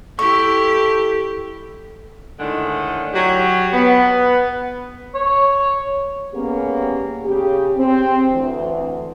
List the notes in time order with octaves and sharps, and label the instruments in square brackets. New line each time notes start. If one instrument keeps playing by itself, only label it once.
[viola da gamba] E4 G4 [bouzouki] A4 [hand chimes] C#6
[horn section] A2 D3 D#3 G#3
F#3 G4
B3
[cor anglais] C#5
[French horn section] G3 A#3 B3 C#4 G4 G#4
C#3 G4
C4
D2 E3